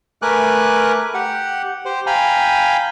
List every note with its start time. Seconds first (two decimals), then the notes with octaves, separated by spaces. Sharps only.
0.22 A3 A#4 B4 G#5 D6 F#6
1.14 G4 F#5
1.85 G4 C5
2.07 F5 G5 G#5 A#5 B5